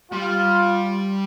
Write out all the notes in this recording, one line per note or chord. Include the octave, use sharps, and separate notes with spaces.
G3 F4